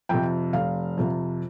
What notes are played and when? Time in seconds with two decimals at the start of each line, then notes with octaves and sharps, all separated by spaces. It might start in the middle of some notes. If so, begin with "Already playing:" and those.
0.09 F2 C3 G5
0.53 F1 F5
0.97 F2 C3